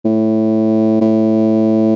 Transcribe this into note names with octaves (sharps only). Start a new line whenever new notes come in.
A2
A2